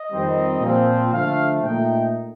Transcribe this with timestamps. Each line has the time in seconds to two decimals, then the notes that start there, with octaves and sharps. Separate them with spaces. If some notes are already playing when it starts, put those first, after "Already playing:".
Already playing: D#5
0.10 F2 D#3 G3 C4 D#4
0.61 A#2 F3 C4
1.12 D3 F3 A3 F5
1.64 A#2 A3 D#4 G5